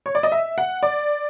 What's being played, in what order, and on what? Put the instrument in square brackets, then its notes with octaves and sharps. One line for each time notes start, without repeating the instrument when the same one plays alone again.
[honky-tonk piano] C#5
D5
D#5
E5
F#5
D5